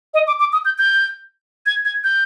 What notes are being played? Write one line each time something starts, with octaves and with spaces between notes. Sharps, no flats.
D#5
D6
D6
D#6
G6
G6
G#6
G#6
G6